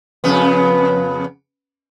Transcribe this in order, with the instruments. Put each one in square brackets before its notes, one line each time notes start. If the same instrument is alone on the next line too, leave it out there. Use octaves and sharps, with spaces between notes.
[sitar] F2 C#3 B3